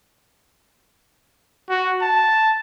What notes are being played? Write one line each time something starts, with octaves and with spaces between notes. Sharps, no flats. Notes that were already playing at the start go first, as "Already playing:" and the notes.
F#4
A5